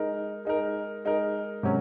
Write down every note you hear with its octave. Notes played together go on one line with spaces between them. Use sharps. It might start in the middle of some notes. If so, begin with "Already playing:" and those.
Already playing: G#3 D#4 A#4
G#3 D#4 A#4
G#3 D#4 A#4
C3 F#3 C#4